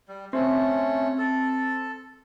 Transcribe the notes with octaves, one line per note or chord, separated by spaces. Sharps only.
G3
A3 C4 C#4
A4